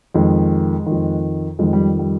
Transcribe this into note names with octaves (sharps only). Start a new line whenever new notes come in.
F2 D#3 G#3
D#3
F2
F2 D#3 G#3
G3
G3